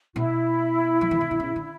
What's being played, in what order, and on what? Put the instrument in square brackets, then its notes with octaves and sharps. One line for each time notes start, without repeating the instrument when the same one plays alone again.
[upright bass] B2 [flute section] E4
[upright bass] F3
E3
D#3
D3
C#3
D3